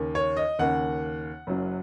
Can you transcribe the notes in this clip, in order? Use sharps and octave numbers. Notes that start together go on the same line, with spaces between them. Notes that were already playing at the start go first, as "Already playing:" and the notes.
Already playing: D#2 C#3 A#3
C#5
D#5
D#2 C#3 A#3 F#5
F#1 F#2 F#3